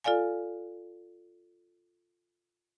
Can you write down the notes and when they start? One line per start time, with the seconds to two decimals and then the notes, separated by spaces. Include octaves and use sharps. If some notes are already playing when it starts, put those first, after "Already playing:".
0.04 F4 A4 D5 F5 G#5